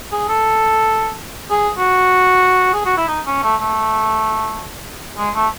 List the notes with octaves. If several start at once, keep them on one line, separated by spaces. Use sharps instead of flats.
G#4
A4
G#4
F#4
G#4
F#4
E4
D#4
C#4
A3
A3
G#3
A3